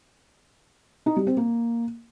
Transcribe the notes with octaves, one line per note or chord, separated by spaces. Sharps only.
D#4
G3
C4
A#3